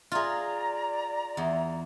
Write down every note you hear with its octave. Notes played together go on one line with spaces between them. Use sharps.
F4 G#4 D5 A#5
E2